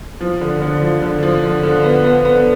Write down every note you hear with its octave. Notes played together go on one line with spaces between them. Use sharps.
F3
D3
D3
F3
D3
F3
D3
D3
B3
B3
B3